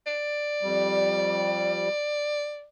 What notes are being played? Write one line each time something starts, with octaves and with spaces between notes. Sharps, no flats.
D5
F2 G3